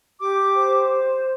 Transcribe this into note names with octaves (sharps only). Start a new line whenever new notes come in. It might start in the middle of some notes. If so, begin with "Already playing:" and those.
G4 D6
C5